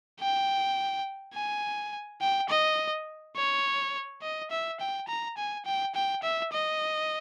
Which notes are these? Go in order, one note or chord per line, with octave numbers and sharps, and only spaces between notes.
G5
G#5
G5
D#5
C#5
D#5
E5
G5
A#5
G#5
G5
G5
E5
D#5